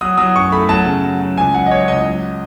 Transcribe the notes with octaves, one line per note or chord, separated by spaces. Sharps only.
F#3 D#6
F#3 D#6
F#2 C#6
A3 B5
F#3 A5
C#3
F#3
F#3
C#2 G#5
F#3 F#5
D#5
F#3 C#5
C#5
C#2 D#5
F#3